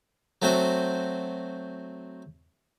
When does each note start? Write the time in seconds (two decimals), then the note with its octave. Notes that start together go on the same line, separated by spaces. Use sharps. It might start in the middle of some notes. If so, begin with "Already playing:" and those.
0.42 F#3 A3 C4 F#4 C5